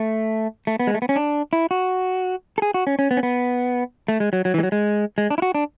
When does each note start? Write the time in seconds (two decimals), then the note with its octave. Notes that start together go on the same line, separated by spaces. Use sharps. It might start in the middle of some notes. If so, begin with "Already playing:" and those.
Already playing: A3
0.67 A3
0.80 B3
0.87 G#3
0.94 A3
1.02 B3
1.09 C#4
1.16 D4
1.53 E4
1.71 F#4
2.58 A4
2.62 G#4
2.74 F#4
2.87 C#4
2.99 C#4
3.11 B3
3.17 C#4
3.23 B3
4.08 A3
4.20 G#3
4.33 F#3
4.45 F#3
4.54 E3
4.59 G#3
4.63 F#3
4.72 G#3
5.18 G#3
5.30 D4
5.38 E4
5.42 F#4
5.55 D4